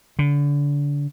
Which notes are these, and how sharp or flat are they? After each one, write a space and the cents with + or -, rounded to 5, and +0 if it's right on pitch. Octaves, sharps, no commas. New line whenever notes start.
D3 -30